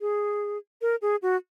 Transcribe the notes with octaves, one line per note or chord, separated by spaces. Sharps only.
G#4
A#4
G#4
F#4